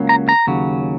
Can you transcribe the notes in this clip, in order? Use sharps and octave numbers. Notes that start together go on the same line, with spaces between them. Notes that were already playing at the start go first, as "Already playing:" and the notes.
Already playing: C#2 C#3 F#3 A#3
A#5
A#5
D#2 C#3 F#3